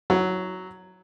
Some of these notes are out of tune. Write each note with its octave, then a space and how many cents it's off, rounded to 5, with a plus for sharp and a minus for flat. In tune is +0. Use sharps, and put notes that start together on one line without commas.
F#3 +0 E4 -25